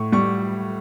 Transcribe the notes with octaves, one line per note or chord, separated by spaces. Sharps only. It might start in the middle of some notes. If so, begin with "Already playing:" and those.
Already playing: A2 C#6
G3 C#6